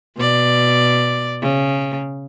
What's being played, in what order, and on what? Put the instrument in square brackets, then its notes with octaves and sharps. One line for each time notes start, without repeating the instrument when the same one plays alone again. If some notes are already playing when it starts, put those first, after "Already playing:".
[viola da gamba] B2 D5
C#3